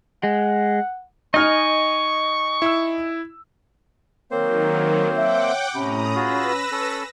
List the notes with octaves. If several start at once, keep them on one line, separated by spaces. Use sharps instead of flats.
G#3 F#5
D#4 D#5 G#5 C#6 F6
E4 E6
D#3 F#3 A#3 C4 A#4 C5 C#5
E5 F#5 G5 D6
A2 C3 C#4 A#5 B5 D#6
F4 F#4 G#4 B4 E6 A#6
C#4 A4